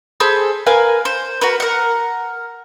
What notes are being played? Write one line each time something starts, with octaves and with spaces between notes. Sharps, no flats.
G#4 A4 C5 B5
A#4 B4 F5 G#5
C5
F#4 A#4 B4
A#4 F#5